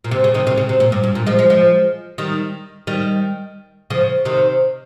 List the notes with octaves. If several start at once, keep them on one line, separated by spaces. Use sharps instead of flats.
A#2
C3
C#3
C3 D#3
C3 D#3
C#3
C3
A#2
G2
G2
A#2
F3 G#3
F3 G#3
F3 G#3
D#3 G3
D#3 G3
C#3 F3
C3 D#3